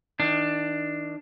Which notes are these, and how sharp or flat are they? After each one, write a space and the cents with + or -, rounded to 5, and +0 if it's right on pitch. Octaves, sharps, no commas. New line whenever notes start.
D#3 +35 D4 +10